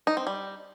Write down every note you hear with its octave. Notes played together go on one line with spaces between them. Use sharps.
D#4
C4
G3